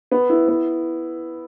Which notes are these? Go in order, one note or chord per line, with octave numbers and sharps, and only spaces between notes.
B3
E4
B3